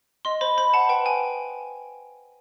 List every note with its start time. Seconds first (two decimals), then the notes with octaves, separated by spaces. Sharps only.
0.25 D#5 C6
0.41 C5 B5
0.57 C5 B5
0.73 F#5 A5
0.89 B4 G5
1.06 G5 G#5